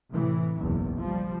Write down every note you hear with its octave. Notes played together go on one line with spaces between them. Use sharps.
A2 C3 E3
F#1 B1 E2
F3 G3